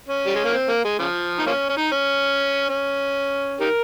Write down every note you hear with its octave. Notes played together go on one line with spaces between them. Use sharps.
C#4
G3
G#3
A#3
C4
A#3
G#3
C#3 F3
D#4
F3 A#3 C#4
C#4
D#4
C#4
C#4
D#4 G4 A#4